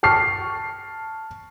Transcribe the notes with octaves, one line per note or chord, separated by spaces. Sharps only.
A5 C#6 F6 C7